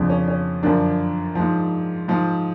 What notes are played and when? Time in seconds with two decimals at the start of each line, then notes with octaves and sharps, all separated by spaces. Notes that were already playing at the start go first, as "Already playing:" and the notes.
Already playing: F2 C#3 F3 D4
0.10 C#4
0.28 C#4
0.63 F#2 D3 F3 D4
1.35 G#2 F3
2.08 G#2 F3